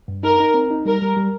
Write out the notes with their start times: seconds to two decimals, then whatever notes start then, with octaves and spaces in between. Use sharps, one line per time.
0.08 G2
0.23 D#4 A#4
0.40 D#4
0.54 C4
0.71 D#4
0.85 G3 A#4
1.02 G3
1.16 G3